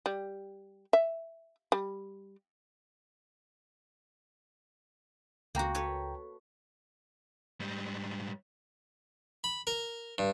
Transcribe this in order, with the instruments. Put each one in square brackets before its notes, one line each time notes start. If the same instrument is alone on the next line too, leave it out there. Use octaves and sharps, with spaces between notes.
[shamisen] G3
E5
G3
[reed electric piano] C#2 G5 A#5 [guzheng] A#3 F#4
[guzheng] A4 B4 C#5
[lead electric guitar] G#2 G3
[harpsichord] B5
A#4
G2